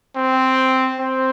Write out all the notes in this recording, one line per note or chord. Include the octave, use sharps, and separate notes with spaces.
C4
C4